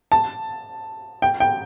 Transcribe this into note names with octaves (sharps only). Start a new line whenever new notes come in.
A5
G5
G5